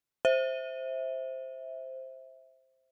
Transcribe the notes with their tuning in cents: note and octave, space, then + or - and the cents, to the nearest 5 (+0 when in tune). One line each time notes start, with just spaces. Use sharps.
C5 +5 E5 -10